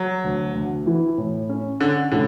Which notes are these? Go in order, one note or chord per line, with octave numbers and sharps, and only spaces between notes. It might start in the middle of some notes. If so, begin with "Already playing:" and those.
Already playing: F#3
D2
D2
E3
A2
C#4
D3 C#4
A2 D3